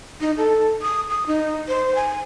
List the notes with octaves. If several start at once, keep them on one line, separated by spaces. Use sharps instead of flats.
D#4
A4
D#6
D#6
D#4
C5
G#5